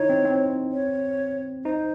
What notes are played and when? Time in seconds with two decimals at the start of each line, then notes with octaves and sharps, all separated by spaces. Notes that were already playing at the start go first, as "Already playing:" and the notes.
Already playing: D#4 E4 C#5
0.09 C4
0.25 C4
0.72 C#5
1.65 D#4 C5